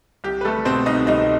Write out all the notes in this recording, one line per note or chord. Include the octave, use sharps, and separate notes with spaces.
C2 G4
B4
G3 A3 A4
B2 C4 C5
C2 D#4 D#5
C2 D#4 D#5